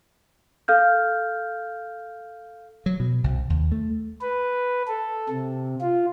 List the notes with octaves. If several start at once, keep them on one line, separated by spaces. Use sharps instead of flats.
A4 F5 F6 G6
F#3
B2
C2
D#2
A3
B4
A4
C3
F4